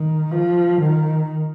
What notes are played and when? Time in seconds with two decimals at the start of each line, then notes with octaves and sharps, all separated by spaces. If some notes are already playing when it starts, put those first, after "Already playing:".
Already playing: D#3
0.31 F3
0.80 D#3